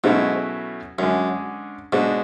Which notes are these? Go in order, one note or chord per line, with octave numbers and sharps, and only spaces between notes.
G#2 B2 F#3 A3 C#4 E4
F#2 D3 G#3 C#4
G#2 B2 G#3 D4 F#4